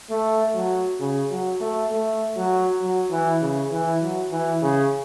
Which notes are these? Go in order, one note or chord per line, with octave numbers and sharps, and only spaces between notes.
A3
F#3
C#3
F#3
A3
A3
F#3
F#3
E3
C#3
E3
F#3
E3
C#3